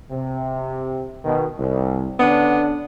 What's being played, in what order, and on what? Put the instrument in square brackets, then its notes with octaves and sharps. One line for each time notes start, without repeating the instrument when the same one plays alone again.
[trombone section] C3
B2 D#3
C2
[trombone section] D3 C#4 D4 [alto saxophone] B3